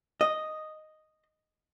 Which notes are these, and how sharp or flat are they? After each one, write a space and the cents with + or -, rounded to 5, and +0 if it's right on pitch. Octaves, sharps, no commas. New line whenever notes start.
D#5 -5